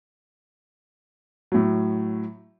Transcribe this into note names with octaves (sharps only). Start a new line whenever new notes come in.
A2 F#3